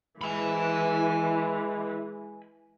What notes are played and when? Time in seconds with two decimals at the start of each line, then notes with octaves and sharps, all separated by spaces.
0.21 E3 G#3 G#5 B5